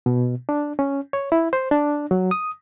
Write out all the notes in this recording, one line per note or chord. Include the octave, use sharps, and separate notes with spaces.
B2
D4
C#4
C#5
E4
C5
D4
F#3
D#6